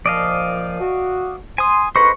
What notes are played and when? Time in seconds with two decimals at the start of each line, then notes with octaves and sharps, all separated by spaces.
0.06 A#2 F3 D5 D#5 F5
0.80 F#4
1.58 G#5 C6 D#6
1.96 D2 G#2 B4 C5 D#5 B5 C#6